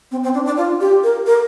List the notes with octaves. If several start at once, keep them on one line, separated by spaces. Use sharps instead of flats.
C4
C4
D4
D4
F4
G4
A#4
A#4